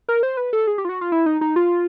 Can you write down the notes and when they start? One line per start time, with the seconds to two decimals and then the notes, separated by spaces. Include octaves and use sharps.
0.09 A#4
0.23 C5
0.37 B4
0.53 A4
0.67 G#4
0.78 G4
0.85 F4
0.89 F#4
1.01 F4
1.12 E4
1.26 D#4
1.41 D#4
1.56 F4